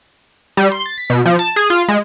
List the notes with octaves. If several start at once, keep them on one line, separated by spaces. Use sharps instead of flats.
G3
C6
A6
B6
B2
F3
A5
G#4
F4
G#3